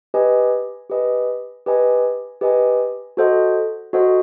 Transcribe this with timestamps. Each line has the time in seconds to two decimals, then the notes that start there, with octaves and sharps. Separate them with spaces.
0.14 G4 B4 D#5 G#5
0.90 G4 B4 D#5 G#5
1.66 G4 B4 D#5 G#5
2.41 G4 B4 D#5 G#5
3.17 F#4 A4 C5 D#5 F#5
3.93 F#4 A4 C5 D#5 F#5